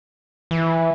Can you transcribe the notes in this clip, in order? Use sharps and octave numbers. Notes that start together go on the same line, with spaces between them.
E3